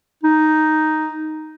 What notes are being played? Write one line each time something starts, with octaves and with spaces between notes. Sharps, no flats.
D#4